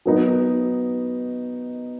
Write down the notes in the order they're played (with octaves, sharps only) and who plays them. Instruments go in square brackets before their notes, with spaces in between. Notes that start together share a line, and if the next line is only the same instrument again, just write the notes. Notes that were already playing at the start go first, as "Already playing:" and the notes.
[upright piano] F#3 B3 D#4